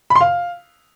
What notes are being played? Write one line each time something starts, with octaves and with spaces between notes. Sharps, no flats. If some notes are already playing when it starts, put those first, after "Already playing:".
B5
C6
F5